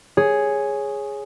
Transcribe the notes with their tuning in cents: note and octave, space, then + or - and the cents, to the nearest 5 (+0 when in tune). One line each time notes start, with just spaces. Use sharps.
G#4 +0 C#5 +0